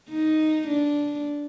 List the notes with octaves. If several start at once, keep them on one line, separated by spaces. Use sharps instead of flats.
D#4
D4